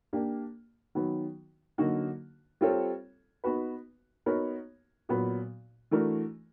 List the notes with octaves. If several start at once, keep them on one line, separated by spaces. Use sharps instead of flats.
A#3 D4 G4
D#3 F#3 B3
D3 F#3 A#3 D#4 F#4
G3 C4 F4 A4 C#5
B3 D#4 F#4 B4
B3 D#4 F#4 A#4 C#5
A#2 F#3 B3
E3 A3 D4 F#4 A#4